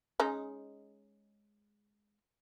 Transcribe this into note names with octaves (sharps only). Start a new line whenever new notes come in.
G#3 C#4 D#4